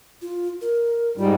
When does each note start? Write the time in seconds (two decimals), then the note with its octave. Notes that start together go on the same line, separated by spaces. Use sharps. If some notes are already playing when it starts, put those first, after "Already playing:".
0.22 F4
0.61 A#4
1.17 G#2 G3 F4